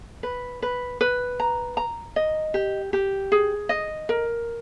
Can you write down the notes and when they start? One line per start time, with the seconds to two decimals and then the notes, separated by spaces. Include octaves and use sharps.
0.23 B4
0.62 B4
1.01 B4
1.40 A#5
1.77 A#5
2.16 D#5
2.54 G4
2.93 G4
3.32 G#4
3.69 D#5
4.09 A#4